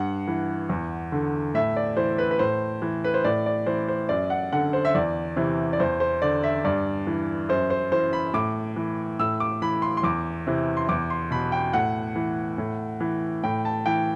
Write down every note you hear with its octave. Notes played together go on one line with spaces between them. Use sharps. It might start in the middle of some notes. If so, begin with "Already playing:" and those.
Already playing: G2 F#5
E3
E2
D3
A2 E5
D5
E3 C5
B4
B4
A2 C5
E3
B4
C5
A2 D5
D5
E3 C5
C5
F#2 D5
F#5
D3 F#5
C5
E5
E2 D5
C3 E3
D5
E2 C5
C5
D3 D5
E5
G2 D5
E3
F#2 C5
C5
E3 C5
B5
A2 D6
E3
A2 E6
D6
E3 B5
C6
C6
E2 D6
C3 E3
C6
E2 D6
C6
B2 B5
G5
A2 F#5
E3
A2
E3
A2 G5
A5
E3 G5